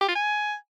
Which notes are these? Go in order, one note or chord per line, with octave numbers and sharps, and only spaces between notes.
G4
F4
G#5